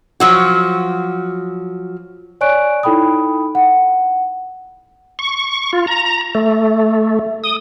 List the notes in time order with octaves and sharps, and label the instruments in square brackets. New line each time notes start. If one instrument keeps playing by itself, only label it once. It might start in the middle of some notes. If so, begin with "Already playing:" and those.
[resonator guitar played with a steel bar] F3 F#3 F#4
[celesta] C#5 D5 G#5 C#6 F#6 D7
D#4 E4 A4 G5 B5 D#6
F#5
[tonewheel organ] C#6
F4
A#5
A3
D#6